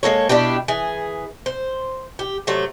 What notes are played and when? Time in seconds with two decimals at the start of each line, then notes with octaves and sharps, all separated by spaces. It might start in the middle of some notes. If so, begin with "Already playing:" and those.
0.03 G#3 A#3 A4 C#5
0.29 B2 D4 E4 G4
0.68 E3 G#4
1.46 C5
2.19 G4
2.47 C3 F#3 A3